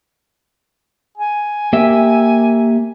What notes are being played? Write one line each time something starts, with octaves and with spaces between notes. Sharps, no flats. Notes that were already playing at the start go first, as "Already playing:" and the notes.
G#5
A#3 G4 E5